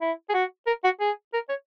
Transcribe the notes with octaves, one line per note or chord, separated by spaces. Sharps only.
E4
G#4
F#4
A#4
F#4
G#4
A#4
C#5